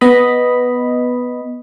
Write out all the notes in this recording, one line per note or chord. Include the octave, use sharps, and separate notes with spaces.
B3 D#5 B5